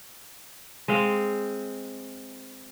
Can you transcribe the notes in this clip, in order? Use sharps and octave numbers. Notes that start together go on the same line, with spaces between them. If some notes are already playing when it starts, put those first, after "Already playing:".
G#3 C4 F5